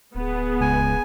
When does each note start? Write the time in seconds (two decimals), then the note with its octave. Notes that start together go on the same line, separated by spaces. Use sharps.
0.15 D1 B3 G#4
0.61 C#2 G#5